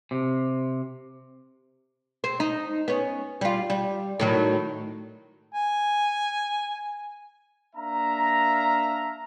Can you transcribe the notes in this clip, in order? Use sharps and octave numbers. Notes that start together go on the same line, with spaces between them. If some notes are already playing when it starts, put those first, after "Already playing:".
C3
C4
D#4
B3 C#4
G3 F4
G3
A2 D#3 F#3
G#5
A#3 D4 E5 F5 A#5